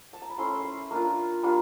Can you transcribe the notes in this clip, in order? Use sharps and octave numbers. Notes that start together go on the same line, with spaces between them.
A5
A#5
B5
A3 C#4 E4 C6
B5 C6
A#3 D4 F4 A#5
G3 A#3 D4 F4